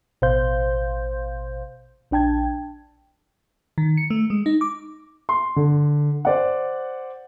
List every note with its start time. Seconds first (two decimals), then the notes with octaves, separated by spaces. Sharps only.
0.22 A1 B2 C5 F5 C6 G6
2.11 A#1 D4 G5 A5 G#6
3.78 D#3
3.97 C#7
4.10 A3
4.30 G#3
4.46 D#4
4.61 D6
5.29 C6
5.56 D3
6.25 C5 D5 F#5